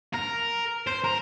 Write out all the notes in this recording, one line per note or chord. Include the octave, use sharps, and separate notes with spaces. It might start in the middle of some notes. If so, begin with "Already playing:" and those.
A#4
C5
A#4